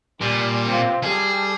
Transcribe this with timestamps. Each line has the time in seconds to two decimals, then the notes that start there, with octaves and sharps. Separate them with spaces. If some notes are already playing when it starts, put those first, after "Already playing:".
0.22 A#2 G3 G#5
0.68 C3 C4 F4
1.03 G3 G#4 A4